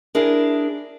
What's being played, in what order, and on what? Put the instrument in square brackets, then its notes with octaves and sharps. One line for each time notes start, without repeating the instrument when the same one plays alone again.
[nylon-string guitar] D4 E4 G#4 A#4